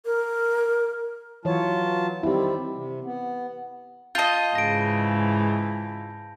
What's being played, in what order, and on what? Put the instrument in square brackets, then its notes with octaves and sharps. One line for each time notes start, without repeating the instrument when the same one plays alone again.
[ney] A#4
[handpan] E3 C#5 [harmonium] F#3 F4 A5
[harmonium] D#3 G3 C4 [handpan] E4 G4
[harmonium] C3
B3
[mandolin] F4 D#5 [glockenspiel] A5 G6
[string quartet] G#2 C#3 E3 [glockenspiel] A#6 D7